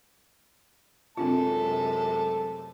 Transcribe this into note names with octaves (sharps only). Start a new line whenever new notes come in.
F#2 C3 G#3 A3 C4 D4 F4 A5